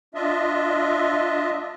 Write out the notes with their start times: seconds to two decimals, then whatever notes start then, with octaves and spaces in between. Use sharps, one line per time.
0.15 D4 F4 D#5 E5